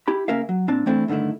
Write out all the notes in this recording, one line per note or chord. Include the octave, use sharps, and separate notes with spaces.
E4 G4 B5
C#3 A#3 C#4 A#4 E5 F5
F#3
A#2 C4 D4 A5
E3 A3 C4 D4 E4 A4
G2 D3 D#3 A3 E4